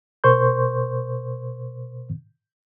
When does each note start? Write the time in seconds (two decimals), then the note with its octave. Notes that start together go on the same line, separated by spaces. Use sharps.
0.24 B2 A#4 C5 C6 C#6 G6